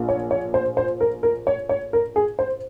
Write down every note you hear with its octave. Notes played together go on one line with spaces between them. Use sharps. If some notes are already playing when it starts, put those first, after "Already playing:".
Already playing: A#1 A#2
C#5
C#5
C5
C5
A#4
A#4
C#5
C#5
A#4
G#4
C5